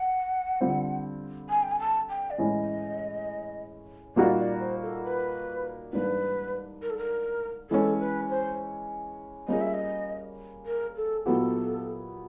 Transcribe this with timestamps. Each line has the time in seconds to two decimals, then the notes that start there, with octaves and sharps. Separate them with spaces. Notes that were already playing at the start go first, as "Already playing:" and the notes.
Already playing: F#5
0.61 D3 G3 C4 F4
1.50 G#5
1.63 G5
1.71 G#5
1.80 A5
2.09 G5
2.31 D5
2.38 A2 E3 G#3 C#4 E4 D#5
4.16 A#2 G3 A#3 D#4 F#4 D5
4.38 D5
4.60 C5
4.82 A4
5.04 B4
5.93 G#2 E3 G3 A#3 D4 B4
6.82 A#4
6.90 A4
6.98 A#4
7.70 E3 G#3 C#4 A4
8.00 B4
8.29 C5
9.48 G3 A#3 C#4 F4 G#4 D#5
9.61 E5
9.74 D#5
10.66 A#4
10.96 A4
11.26 A#2 F#3 B3 E4 G4 A4